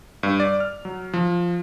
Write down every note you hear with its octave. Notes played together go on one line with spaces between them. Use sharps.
G2
D5
F6
F#3
F3